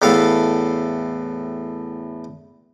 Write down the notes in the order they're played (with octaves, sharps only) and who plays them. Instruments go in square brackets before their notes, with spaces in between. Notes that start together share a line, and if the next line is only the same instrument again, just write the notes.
[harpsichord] E2 A2 A4 F5